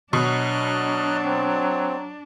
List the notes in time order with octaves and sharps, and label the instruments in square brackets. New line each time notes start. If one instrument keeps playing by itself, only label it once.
[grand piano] B2 [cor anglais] F#3 [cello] D4 [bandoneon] D#5 F6 F#6
[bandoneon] C4